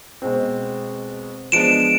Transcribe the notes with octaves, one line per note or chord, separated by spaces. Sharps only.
B2 G#3 C4
F3 G#3 B3 D4 D7 E7